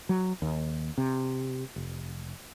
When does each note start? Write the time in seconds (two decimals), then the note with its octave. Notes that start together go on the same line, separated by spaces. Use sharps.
0.09 F#3
0.42 D#2
0.98 C3
1.76 F1